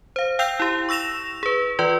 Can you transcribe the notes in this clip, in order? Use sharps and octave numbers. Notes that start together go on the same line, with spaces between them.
C5 F5
F5 G5 E6 G6 C7 F7
E4 G4
C#6 E6 A#6 E7 F7
G#4 B4
E3 F4 B4 D5